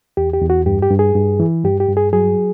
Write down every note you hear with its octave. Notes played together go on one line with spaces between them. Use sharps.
E2 G4
G4
E2
F#4
G2 G4
G4
G2
G#4
G2
E3
G2 G4
G4
G2
G#4
F#3 G#4